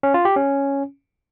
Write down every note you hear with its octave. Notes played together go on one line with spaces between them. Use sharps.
C#4
F4
G4
C#4